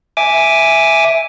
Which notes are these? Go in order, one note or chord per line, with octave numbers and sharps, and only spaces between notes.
E5 G#5 D6